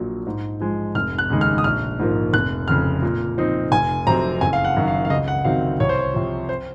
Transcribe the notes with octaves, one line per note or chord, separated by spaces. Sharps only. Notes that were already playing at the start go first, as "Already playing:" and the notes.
Already playing: A#1 A#2 F#3
G#2
F3 G#3
F1 F6
F#6
D#2 C#3 G#3 D#4
F6
D#6
A#1 F6
G#2 F3 A#3
F1 F#6
F2 C#3 F6
A#2
F3 C4 D#4
F1 G#5
F2 C3 F#3 C4 A#5
F#1 G#5
F5
F#5
F#2 D#3
F5
F5
C#2 D#5
F#5
C3 D#3 F#3 C4 F5
C2 C#5
C5
C#5
C3 F3
C5